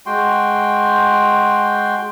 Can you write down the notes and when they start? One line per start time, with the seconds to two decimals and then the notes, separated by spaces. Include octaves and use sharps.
0.06 G#3 F#4 G5 C6